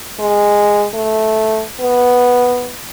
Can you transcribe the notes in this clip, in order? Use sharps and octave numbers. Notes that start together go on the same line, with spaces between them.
G#3
A3
B3